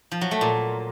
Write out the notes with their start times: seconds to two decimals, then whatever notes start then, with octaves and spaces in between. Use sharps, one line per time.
0.12 F3
0.21 F#3
0.31 A3
0.41 A#2